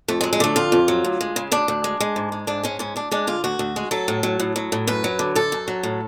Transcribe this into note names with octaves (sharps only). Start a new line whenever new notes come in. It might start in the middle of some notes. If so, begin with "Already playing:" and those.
F2 A3
F#3 G#3
G#3
D3 A3
F2 F4
F2
F#3
D2
G#3
C#3
D2 D4
D2
G#3
G#3
G#2
G#3
G#2 D4
G#3 C#4
G#2 C#4
D2 D4
G#3 D4
D3 F4
D2 F#4
D2
G#3
F#3 A4
A2
F#3
A2
F#3
A2
F#2 B4
F#3
D3
F#2 A4
F#2
F#3
A2